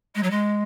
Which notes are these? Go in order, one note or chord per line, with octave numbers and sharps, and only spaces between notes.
G#3
F#3
G#3